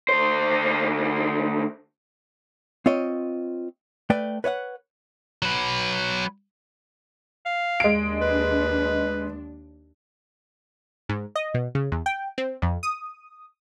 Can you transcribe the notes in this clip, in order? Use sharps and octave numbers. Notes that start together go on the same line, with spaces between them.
D2 C5
C4 F4 C#5 D#5
A3 B4 D5 G5
B4 C#5 D#5 F#5
F#3 B4
F5
D#2 G#3 D4 D7
B4
G#2
D#5
B2
C#3
E2
G5
C4
F2
D#6